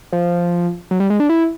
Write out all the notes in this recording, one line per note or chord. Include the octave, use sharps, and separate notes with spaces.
F3
F#3
G3
G#3
D4
E4